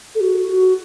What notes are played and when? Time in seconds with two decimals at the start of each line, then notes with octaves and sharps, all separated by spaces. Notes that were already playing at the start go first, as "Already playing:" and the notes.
0.15 A4
0.20 F#4
0.48 F#4